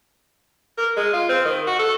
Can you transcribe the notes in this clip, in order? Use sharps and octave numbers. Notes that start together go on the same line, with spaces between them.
A#4
G#3
F4
C4
D#3
F#4
A4